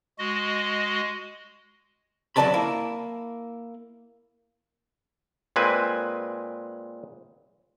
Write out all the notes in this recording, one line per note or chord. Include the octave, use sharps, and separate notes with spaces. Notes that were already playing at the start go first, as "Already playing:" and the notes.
G#3 F#4 D#5
F#2 F#3 B4 D5 A5 B5
A#3 E4
A#2 G#3 C4 B4 G#5